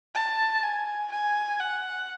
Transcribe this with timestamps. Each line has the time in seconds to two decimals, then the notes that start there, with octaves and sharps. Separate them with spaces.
0.15 A5
0.63 G#5
1.12 G#5
1.60 F#5